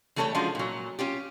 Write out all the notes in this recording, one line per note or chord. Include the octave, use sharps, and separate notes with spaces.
E3 G3 A3 A4 A#4 C#5
F3 G#3 C#4 D4 F4 F#4
A#2 F#3
C#4 F4 G4